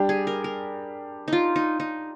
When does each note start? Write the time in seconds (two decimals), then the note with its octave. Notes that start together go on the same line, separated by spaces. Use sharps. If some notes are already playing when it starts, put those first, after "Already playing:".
Already playing: G3 D4 G4
0.09 G#4
0.27 A#4
0.44 A#4
1.28 D#4 F4
1.56 D#4
1.80 D#4